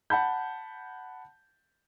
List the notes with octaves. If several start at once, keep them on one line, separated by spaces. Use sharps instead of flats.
F#5 A5 B5 G6